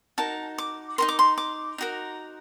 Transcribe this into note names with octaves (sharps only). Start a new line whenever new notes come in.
D#4 F#4 A#4 A5
D6
D#4 F#4 A#4 C6
D6
C6
D6
D#4 F#4 A#4